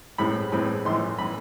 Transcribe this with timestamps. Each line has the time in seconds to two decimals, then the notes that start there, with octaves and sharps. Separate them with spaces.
0.18 A2 E3 G#3 C4 B5
0.52 A2 E3 G#3 C4 B5
0.85 A#1 A2 E3 C6
1.19 A2 E3 B5